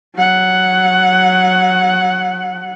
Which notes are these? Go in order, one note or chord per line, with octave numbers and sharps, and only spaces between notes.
F#3 F#5